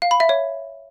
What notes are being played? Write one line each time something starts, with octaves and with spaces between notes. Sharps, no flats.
F5
B5
E5
C#5